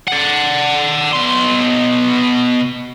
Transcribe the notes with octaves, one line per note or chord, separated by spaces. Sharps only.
D5 F#5
B2 C6